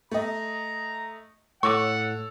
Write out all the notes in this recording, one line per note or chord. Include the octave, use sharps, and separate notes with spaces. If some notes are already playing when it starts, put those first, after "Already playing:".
A3 D#5 A#5
A2 A4 C#5 F#5 C#6 D6 E6